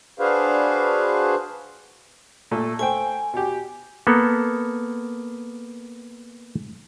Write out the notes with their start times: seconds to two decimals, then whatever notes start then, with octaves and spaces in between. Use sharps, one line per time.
0.19 D4 F#4 G#4 B4 C5 F5
2.51 A#2 A3 A4
2.79 A3 C5 G5 G#5
3.34 B2 G4
4.07 A#3 B3 A4